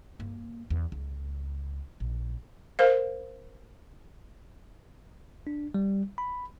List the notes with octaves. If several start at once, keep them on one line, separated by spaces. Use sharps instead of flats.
G2 A#3
E2
C#2
A#1
A#4 C5 F5
D4
G3
B5